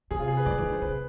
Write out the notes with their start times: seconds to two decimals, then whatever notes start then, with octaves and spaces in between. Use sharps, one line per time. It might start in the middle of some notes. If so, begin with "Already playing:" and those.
0.11 C3 G#4
0.19 F4
0.28 G#4
0.37 B4
0.46 C3 D5
0.55 B4
0.58 D#3
0.64 D3
0.73 C5
0.82 C3 B4